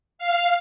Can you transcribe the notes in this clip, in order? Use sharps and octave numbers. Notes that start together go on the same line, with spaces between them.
F5